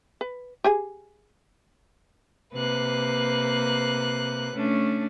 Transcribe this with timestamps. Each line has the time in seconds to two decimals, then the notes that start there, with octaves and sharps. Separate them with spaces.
0.21 B4
0.64 G4 G#4 G#5
2.54 C3 A#3 B4 F#6
4.55 A3 C#4 D4